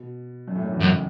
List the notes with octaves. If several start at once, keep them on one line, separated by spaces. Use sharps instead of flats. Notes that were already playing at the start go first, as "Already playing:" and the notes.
Already playing: B2
F#2 F#3
A2 A3
F#2 F#3
E2 E3
C#2 F#2 C#3